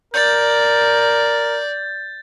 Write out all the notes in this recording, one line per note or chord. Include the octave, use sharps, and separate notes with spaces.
A#4 D5 G6 A6